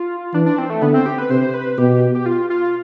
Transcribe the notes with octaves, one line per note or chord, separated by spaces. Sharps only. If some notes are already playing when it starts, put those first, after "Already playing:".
Already playing: F4
E3 D4
D4
C4
A3
D3 B3
C4
G4
B4
C3 C5
B4
B2 G4
G4
F4
F4